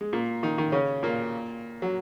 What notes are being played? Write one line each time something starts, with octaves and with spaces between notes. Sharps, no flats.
G#3
A#2 A#3
D#3 D#4
D#3 D#4
C#3 C#4
A#2 A#3
F#3